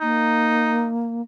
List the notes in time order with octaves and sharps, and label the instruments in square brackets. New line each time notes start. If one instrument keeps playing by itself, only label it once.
[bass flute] A#3 [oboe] D#4